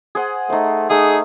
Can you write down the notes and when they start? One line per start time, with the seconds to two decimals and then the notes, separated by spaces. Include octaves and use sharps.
0.15 G#4 C5 F#5
0.50 A3 D#4 C5
0.90 A3 D#4 G#4 D#6